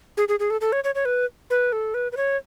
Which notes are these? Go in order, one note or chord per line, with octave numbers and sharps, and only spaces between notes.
G#4
G#4
G#4
A4
A4
C#5
C#5
C#5
B4
B4
A4
B4
B4
C#5